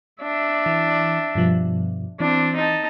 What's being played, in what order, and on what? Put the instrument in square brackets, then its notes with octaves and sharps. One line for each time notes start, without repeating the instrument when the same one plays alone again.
[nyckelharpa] D4 E5
[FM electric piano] E3
G2 B2 F3
[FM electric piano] E3 [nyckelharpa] C4 D4
[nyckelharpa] D#4 A5